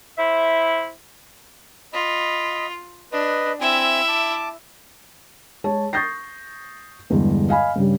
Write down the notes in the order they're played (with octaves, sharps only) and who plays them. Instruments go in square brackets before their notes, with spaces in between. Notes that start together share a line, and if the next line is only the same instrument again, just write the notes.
[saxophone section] E4 C5 E5
[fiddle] F4 [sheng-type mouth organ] D#5 B5
[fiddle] D4 [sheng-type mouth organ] B4 D#5
[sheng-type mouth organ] C4 G#5 [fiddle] E4 E5
[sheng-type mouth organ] A5 D6
[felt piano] G#3 C#5 A5
C#6 D#6 G6 A6 A#6 C7
E2 G2 D3 G#3
D#5 F5 G#5 B5
G2 C#3 G3